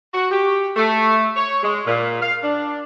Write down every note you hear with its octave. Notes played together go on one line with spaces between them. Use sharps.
F#4
G4
A3
C#5
G#3
A#2
F5
D4